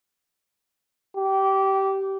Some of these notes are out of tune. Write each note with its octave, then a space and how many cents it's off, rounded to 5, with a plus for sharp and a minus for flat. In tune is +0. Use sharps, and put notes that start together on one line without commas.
G4 -20